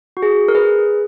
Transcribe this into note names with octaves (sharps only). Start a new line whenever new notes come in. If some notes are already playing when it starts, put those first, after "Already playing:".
F#4
G#4
A#4
G#4 B4